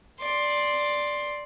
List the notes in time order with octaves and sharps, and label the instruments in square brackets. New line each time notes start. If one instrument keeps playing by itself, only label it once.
[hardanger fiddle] D5 C6